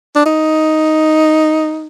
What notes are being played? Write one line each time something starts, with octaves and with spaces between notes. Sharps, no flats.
D4
D#4